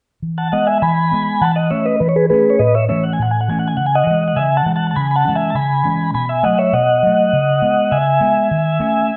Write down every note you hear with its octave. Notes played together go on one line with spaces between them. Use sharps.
E3
F#5 A5
G#3 B3 D#5 F#5
E5 G#5
E3 G#5 B5
G#3 B3
E3 F#5 A5
D#5 F#5
A3 C#4 C#5 E5
B4 D#5
E3 B4
C#5
G#4 B4
A3 C#4 G#4 B4
C#5
A2 B4 D#5
C#5 E5
E3 A3 C#4 C#5 E5
F#5
G#5
A2 F#5
G#5
F#5
E3 A3 C#4 G#5
F#5
G#5
C#3 F#5
G#5
D#5 F#5
E3 G#3
F#5
C#3 E5 G#5
F#5 A5
E3 G#3
F#5 A5
A5
C#3 G#5 B5
B5
F#5 A5
E3 G#3 C#4
E5 G#5
A5
C#3 G#5 B5
E3 G#3 C#4
B2 G#5 B5
E5 G#5
F#3 A3 D#5 F#5
C#5 E5
B2 D#5 F#5
F#3 A3
C#3
G#3 B3
C#3 E5 G#5
G#3 B3
D#3
A3 C#4